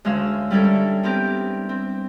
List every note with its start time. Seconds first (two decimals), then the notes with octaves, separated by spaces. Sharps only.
0.05 D2 G#3 C#4 F5 E6
0.51 G3 C#4 E4 A4 A#4
0.64 D4
1.03 B3 C4 G4 A#4
1.69 C4